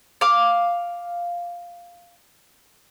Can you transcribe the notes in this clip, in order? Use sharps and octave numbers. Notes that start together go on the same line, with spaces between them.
F5 D6